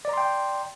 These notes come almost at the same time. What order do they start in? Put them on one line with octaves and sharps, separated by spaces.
D5 A#5 C6 G5